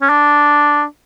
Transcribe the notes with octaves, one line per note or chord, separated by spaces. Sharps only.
C#4
D4